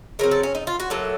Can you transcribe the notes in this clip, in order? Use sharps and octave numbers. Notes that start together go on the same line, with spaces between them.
C#3 F#3 C4 A#4
A4
C#4
D#4
F4
F#4
A2 F#3 A#3 A4